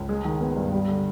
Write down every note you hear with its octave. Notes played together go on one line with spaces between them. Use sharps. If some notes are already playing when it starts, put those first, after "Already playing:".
Already playing: C#2
G#3
D#3
B3
G2
G3
D3